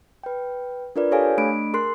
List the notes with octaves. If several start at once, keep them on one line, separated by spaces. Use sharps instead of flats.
B4 G5
D4 F4 A#4 B4 D5
G4 A4 C#5 F5 G#5
A3 D4 B5 D7
G#4 A#4 C6 F#6 C7